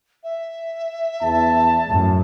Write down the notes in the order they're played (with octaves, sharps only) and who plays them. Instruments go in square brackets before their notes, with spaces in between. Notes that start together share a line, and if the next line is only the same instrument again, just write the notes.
[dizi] E5
[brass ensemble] E2 [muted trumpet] A5
[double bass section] F#2 A2